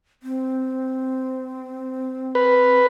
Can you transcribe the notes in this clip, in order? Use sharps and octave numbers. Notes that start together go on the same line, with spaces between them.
C4
B4